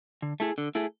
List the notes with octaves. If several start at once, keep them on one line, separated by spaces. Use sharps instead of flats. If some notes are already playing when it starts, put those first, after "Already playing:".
D3
A3 E4 G#4
D3
A3 E4 G#4